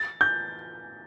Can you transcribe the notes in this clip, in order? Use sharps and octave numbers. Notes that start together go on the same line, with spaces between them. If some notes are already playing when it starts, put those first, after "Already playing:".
Already playing: A6
G6